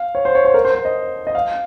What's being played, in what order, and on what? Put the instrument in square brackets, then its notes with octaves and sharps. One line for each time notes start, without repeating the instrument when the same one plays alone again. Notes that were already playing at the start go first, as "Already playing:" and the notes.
Already playing: [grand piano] F5
C#5
C5
C#5
C5
A#4
C5
C5
D#5
D#5
F5